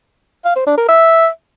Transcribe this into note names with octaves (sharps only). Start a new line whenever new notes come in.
F5
C5
D4
A#4
E5